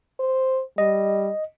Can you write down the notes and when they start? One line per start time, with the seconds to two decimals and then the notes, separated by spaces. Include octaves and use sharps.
0.20 C5
0.78 G3 D#5